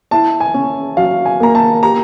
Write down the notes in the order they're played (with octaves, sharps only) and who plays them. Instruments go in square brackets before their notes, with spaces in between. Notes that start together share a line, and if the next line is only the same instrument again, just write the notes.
[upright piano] E4 [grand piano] A5
[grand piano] G#5
[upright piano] C#4
[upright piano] F#3 [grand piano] F5
[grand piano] G#5
[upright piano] A#3 [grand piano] A#5
[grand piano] A5
[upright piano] G4 [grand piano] A#5